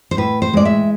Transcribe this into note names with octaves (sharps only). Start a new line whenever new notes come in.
C5
A2 B4
C5
G#3 D5
E5